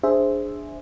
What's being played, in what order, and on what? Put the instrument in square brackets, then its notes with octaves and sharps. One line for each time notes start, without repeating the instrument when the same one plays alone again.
[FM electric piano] D4 G#4 C5 E5